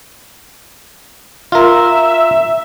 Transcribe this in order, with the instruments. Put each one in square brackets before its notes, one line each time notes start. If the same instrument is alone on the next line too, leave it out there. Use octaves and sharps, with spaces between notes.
[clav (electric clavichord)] F4 A#4 [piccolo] E5